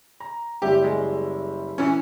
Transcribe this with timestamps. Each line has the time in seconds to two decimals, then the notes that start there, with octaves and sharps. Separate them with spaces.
0.20 A#5
0.62 F#1 G3 G4 E5
0.84 G#3
1.78 E3 C#4